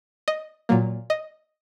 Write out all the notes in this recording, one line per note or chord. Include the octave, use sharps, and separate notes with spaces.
D#5
A#2 F#3 A#3
D#5